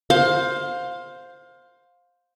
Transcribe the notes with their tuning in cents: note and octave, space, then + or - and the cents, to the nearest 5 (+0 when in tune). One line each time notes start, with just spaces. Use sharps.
C5 +0 F5 +20